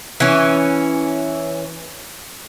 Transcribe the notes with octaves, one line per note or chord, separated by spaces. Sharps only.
E3 C#4